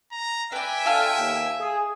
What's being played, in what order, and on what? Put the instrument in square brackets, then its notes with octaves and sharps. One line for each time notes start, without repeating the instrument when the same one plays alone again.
[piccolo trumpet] A#5
[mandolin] B4 D5 [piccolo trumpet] E5 [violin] G5 G#5
[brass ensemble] D4 F4 A4 [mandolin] F5 A5 F6
[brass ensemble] D#2
G#4